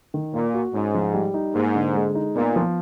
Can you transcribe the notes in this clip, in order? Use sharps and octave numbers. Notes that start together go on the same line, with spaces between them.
D#3
A#2 A#3
F#4
G#2 C#4
F3
G3
D#4
G#2 A#3
D3
G#3
D#4
A#2 B3
F3